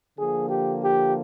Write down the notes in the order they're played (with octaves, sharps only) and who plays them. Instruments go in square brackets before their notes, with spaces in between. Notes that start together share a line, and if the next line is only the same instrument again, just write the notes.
[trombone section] D3 F3 A#3 G#4
G4
G4